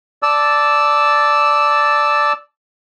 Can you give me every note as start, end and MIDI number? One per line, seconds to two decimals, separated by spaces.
0.23 2.33 74
0.23 2.33 81
0.23 2.33 88